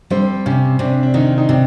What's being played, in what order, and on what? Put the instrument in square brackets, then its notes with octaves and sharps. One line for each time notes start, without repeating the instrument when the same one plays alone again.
[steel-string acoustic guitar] G3 [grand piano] C4
[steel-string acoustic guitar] C3 [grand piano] C#4
[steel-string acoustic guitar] C3 [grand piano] D4
[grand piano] D4
[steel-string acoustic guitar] D#3 [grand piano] D#4
[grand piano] D#4
[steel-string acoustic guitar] C3 [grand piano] D4